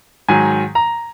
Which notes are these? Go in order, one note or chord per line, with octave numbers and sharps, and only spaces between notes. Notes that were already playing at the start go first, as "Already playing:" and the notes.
G#2 D#3 F#3 G#5
A#5